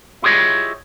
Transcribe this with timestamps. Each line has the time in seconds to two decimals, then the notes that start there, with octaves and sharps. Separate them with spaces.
0.22 E4 F4 G4 G#4 C#5 D#5